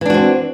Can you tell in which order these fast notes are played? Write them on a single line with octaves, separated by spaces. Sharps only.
E3 D4 F#4 C4